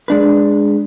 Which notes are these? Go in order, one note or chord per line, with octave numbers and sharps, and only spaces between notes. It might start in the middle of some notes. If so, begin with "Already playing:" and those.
G#3 D4 B4